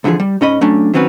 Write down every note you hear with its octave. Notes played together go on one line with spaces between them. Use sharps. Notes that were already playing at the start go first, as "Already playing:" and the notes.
C2 D3 E3 F3 G#4
G3
G#2 C#4 D#5 B5
F#3 A3 C#4 D4
D#3 F#3 C4 C#4 B4